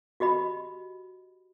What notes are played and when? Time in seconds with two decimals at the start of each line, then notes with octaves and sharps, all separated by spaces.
0.20 F#4 G4 D#5 B5